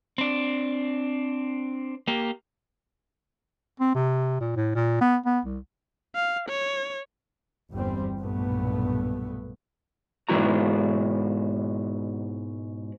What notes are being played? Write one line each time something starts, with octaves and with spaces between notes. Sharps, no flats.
C4 D4
A#3 G4
C4
C3
A#2
A2
A#2
B3
B3
C2
F5
C#5
G1 E2 G3 C4
B1 G2 A#2 A3 B3
G#2 B2 E3 E4 F#4 A#5